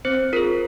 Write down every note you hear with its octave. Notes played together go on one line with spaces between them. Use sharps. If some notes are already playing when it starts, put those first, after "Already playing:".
C4 C5
F4 G#4 A#4